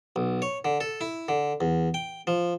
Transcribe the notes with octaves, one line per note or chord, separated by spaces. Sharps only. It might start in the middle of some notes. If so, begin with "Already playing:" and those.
B1
C#5
D3
A4
E4
D3
E2
G5
F3